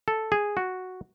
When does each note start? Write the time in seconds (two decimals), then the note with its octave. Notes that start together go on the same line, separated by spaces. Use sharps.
0.08 A4
0.32 G#4
0.57 F#4